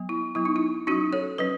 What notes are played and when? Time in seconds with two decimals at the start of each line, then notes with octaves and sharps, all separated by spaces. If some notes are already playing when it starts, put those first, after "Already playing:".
Already playing: F#3 B3
0.09 E4
0.35 F#3 B3 E4
0.45 D#4
0.56 E4
0.87 F#3 C#4 D#4 F#4
1.13 A4 C#5
1.38 F#3 C#4 B4 D#5